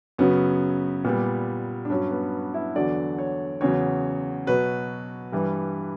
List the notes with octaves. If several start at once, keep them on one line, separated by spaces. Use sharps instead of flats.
F#2 C#3 F#3 B3
A#2 G3 B3
D4
G2 F#3 C#4
B3
E4
E2 D3 F#3 D5
C#5
E2 C#3 F#3 C#5
B2 F#3 B4
G2 E3 G3